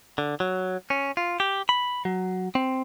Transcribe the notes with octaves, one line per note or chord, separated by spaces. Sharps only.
D3
F#3
C#4
F4
G4
B5
F#3
C4